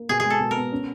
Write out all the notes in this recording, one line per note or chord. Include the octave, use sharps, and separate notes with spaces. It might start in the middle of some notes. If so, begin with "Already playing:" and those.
Already playing: A#3
B2 G#4
G#4
G#3
A4
B2
A#4
B3
C#4